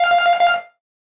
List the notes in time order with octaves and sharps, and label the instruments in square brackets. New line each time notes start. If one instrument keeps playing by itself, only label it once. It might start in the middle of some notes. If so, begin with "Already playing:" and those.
Already playing: [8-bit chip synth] F5
F5